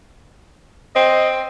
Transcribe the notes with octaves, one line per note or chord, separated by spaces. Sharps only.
C4 D#5